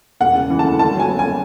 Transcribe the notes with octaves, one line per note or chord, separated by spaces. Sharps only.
E1 F#5
C#3
E3
A5
D2
G#1 A5
F#3
G#5
B3
G#5